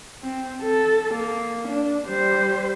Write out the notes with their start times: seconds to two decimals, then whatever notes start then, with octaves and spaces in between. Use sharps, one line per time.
0.23 C4
0.63 A4
1.14 A#3
1.68 D4
2.07 G3 C5